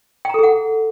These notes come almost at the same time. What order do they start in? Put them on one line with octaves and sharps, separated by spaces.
G5 A#5 A4 G#4 F#5